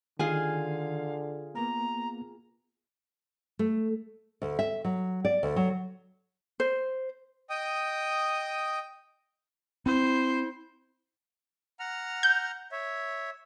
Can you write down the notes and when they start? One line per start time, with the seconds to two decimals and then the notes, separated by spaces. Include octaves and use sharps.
0.19 D3 D#3 F4 G#4 F5 G#5
1.55 A#3 B3 A#5
3.59 A3
4.42 D2
4.59 E5
4.85 F#3
5.25 D5
5.43 D2
5.56 F#3
6.60 C5
7.50 D#5 G5 D#6
9.86 C4 E4 C5
11.79 F#5 A#5 F6
12.23 G6
12.72 C#5 E5